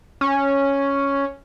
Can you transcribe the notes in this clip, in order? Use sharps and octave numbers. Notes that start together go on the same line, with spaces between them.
C#4